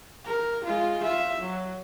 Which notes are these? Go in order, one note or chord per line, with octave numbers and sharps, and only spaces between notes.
A#4
G#3 F4
F4 E5
F#3